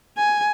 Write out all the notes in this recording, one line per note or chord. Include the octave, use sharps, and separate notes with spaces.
G#5